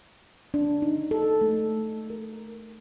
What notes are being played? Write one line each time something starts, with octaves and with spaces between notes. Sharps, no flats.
D4
D#4
A4
A3
A#4